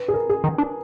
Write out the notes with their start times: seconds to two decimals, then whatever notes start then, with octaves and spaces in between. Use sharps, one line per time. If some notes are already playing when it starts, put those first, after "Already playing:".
Already playing: B4
0.08 G#4
0.14 A#4
0.29 G#4
0.44 D#3
0.58 D4